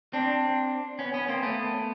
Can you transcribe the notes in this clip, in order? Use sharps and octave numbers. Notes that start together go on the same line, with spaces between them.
C4 D4
B3 C#4
B3 C#4
A#3 C4
A3 B3